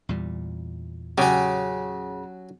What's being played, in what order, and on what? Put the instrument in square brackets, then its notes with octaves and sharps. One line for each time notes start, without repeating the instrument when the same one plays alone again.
[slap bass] E2 A#2 G3
[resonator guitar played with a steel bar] C#3 [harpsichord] F#3 F#4 [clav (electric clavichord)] C#4 G4